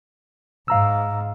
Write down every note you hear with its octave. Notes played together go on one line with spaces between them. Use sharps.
G#2 F5 A#5 E6